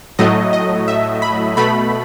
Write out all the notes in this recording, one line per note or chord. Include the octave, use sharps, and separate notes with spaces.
A2 F#3 A3 D#5
D#5
E5
B5
B2 A3 B5